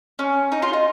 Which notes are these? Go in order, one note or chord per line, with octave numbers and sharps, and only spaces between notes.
C#4
D#4
F4
D#4